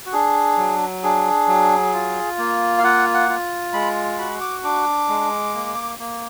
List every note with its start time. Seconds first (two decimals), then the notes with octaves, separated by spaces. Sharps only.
0.06 F#4
0.12 D4 G#4
0.58 F#3
1.03 D4 G#4
1.48 F#3
1.93 F4
2.38 A#3
2.78 F5
2.84 F4 F#5
3.14 F#5
3.29 F4
3.73 G#3 B5
4.18 F#4 B5
4.41 D6
4.63 D4 D6
5.09 G#3
5.54 A#3
5.99 A#3